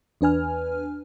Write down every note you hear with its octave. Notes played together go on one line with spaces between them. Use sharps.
E2 D4 B4 G#5 F6